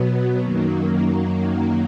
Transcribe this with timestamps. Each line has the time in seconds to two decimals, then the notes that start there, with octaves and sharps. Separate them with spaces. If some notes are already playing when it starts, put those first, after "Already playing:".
Already playing: B2 F#3 B3
0.40 F#2 D#3 F#3 A#3